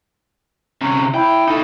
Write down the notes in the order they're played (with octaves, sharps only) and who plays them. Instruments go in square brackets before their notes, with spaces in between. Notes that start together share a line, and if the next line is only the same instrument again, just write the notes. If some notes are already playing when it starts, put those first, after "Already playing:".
[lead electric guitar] C3 C#4
[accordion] E4 [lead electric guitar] G5
[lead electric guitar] D#4 A4